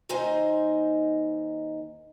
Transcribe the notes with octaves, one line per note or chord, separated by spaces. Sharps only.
D#2 D#4 C5 D#5 G#5